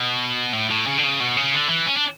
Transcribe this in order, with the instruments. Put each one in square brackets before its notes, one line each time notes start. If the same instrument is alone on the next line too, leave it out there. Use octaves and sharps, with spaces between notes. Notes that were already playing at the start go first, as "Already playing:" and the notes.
Already playing: [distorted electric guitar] B2
A2
A2
C#3
D3
C#3
B2
C#3
D3
E3
C#4
D4